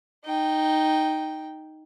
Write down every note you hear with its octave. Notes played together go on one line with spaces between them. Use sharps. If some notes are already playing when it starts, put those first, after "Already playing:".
D#4 G5